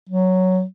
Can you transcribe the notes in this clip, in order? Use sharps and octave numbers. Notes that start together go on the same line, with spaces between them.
F#3